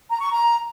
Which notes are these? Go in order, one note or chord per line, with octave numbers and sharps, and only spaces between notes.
A#5
C#6
A#5